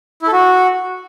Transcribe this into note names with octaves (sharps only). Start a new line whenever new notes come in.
E4
A4
F#4